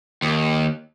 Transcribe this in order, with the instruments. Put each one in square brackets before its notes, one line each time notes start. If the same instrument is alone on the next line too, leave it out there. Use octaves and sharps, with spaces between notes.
[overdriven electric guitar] D#2